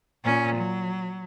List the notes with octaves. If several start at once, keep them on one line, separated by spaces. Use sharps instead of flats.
A#2 C#4
F#3